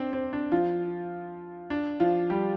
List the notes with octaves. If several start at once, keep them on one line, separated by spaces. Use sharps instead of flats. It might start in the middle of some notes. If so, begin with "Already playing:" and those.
Already playing: C4 D4 C5
C4
D4
F3 F4
D4
F3 F4
G3 G4